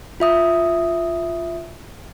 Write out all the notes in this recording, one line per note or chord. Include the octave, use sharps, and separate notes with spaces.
F4 E5 D#6